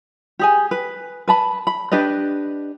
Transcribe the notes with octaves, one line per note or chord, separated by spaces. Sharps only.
G4 G#4 G#5
B4
B4 A5 B5
B5
D4 G4 B4 D#5